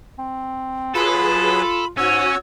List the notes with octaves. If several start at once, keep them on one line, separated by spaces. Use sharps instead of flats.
C4
F#3 F4 G#4 A4 B4 B5
G#2 C#4 F#4 C#5 E6